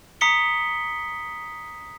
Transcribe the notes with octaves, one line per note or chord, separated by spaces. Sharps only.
A#5 D#6 B6 C#7 G7